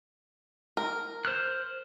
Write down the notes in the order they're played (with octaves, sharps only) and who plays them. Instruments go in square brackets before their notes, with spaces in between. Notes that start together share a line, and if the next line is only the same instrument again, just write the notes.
[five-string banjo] A#4
[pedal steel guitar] C5 F6 F#6